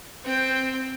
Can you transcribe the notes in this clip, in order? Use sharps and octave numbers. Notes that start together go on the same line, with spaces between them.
C4 G5